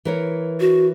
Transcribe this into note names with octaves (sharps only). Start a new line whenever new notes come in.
E3 A#4 C#5
F#4